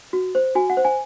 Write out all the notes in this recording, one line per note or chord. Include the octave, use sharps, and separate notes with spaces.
F#4
C5
F#4 G#5
F#5
C5
G#5